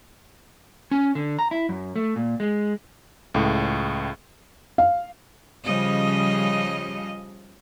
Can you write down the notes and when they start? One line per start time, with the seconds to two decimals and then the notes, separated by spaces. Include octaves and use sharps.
0.91 C#4
1.15 D3
1.39 A#5
1.51 E4
1.69 F#2
1.96 A3
2.16 A#2
2.40 G#3
3.34 C#2 A2
4.78 F5
5.64 C#3 F3 G3 D#5